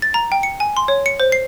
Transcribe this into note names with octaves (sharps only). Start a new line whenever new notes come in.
A6
A#5
G5
C#7
G#5
C6
C#5
C#7
C5
C7